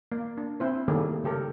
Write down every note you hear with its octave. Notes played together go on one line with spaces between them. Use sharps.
A#3
D4
C4 E4 C5
D#3 G3 A3 A#3 G#4
C#3 G4 A4 A#4